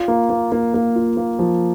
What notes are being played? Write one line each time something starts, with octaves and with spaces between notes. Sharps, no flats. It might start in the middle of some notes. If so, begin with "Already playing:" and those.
Already playing: F4
A#3
A#3
A#3
A#3
F4
A#3
F3